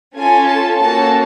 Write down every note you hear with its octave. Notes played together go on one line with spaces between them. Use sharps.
C#4 F4 A4 G#5
A5
A#3 C#4 F#4 A4 A5